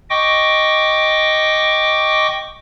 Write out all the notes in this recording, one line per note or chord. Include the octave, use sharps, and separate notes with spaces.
D#5 G5 C#6 D6